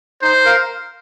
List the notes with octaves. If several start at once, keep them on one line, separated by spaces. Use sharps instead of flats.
D#4 C5
A#4 F5